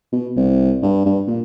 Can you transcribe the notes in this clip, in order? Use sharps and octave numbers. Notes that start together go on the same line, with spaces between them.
B2
C2
G2
G2
A#2